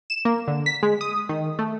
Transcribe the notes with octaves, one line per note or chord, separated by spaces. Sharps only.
E7
A#3
D3
B6
G#3
D#6
D#3
A3